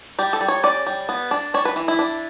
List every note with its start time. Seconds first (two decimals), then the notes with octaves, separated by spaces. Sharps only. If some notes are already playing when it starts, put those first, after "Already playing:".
0.19 G3 G4
0.33 A4
0.41 G3
0.48 C#5
0.63 C#4 D5
0.87 G3
1.09 B3
1.31 D4
1.54 D4 C#5
1.65 B4
1.76 E3
1.88 E4
1.99 D4